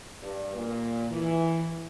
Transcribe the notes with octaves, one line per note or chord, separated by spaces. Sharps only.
G2
A#2
E3